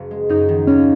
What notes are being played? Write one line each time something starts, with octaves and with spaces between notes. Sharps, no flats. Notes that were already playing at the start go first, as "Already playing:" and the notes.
Already playing: F#1
G#3
F#2 D#4
D#3
D#2 C#4